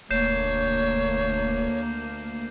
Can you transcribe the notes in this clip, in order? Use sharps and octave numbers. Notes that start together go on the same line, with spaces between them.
E1 D2 A#3 C#5 G6 C7 E7